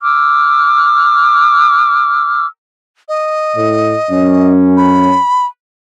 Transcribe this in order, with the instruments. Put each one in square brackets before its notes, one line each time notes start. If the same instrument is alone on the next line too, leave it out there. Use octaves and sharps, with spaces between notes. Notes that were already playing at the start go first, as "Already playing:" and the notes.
[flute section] D6 E6 F6
[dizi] D#5
[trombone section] A2
F#2 C#4
[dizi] B5